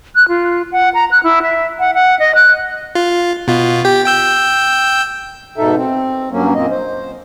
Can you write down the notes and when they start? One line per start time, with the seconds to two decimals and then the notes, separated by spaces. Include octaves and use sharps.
0.15 F#6
0.28 F4
0.72 F#5
0.94 A#5
1.11 F#6
1.23 E4
1.42 E5
1.79 F#5
1.94 F#5
2.19 D#5
2.35 F#6
2.95 F4
3.48 B2 F4
3.85 G4 G5
4.06 G5 E6 G6
5.58 G#2 B2 D#4 A4 E5
5.76 C4
6.32 G2 F#3 A#3 C#4
6.55 F#2 A#2 A#3 C4 D#5
6.71 C5